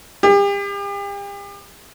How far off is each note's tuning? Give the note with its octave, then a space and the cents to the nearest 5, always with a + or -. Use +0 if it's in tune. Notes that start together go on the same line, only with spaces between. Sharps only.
G4 +40